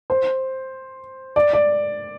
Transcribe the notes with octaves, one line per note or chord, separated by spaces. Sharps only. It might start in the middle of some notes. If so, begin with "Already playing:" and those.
C5
D5
D5